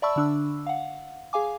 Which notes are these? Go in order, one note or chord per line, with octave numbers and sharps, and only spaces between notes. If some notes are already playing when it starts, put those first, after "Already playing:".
D5 E5 A5 B5 C#6 E6
D3 D4 E6
F5 F#5
G#4 F5 G#5 D6